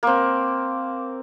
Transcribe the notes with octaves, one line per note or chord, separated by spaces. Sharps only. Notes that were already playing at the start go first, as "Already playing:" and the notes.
A#3 C4